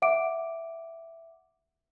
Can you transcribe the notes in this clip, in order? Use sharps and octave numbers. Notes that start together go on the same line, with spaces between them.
E5 F#5 D6 D7